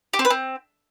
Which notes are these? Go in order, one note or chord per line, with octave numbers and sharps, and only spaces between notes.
G4
C4
B4
C4